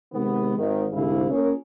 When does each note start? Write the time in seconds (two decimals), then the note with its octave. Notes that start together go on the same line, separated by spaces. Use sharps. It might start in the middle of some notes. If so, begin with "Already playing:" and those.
0.13 C3 D#3 G#3 B3
0.57 G#1 D#3
0.92 C2 G#2 D3 E4 G#4 F5
1.30 A#3 C#4 F4 G#4 A#4 C#5